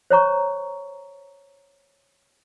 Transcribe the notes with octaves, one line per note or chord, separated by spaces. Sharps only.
C5 C#5 A#5 C#6